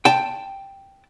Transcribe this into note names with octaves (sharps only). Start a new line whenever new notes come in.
G5 A5